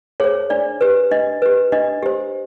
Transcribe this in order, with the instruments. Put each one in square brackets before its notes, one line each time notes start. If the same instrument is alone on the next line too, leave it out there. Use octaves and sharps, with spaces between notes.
[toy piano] G#4 C5 C#5
D4 D5
G4 B4
D4 D#5
G4 B4
D4 D#5
G4 C5